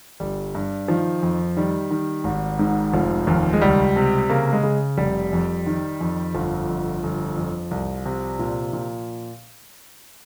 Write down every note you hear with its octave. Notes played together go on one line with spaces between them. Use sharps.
G1 G3
G2
D#3 F3
F2
D#3 G3
D#3
G#1
G#2
F1 F3
D#2 F3
G#3
C#2 G3
C3
C#3 A#3
G#3
C#3
F1 G3
F2
D#3
F2
G1 F3
F2
G1
F2
C2
C3
A#2
A#2